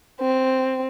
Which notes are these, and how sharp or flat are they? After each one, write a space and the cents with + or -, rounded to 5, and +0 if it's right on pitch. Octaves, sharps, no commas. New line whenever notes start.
C4 +0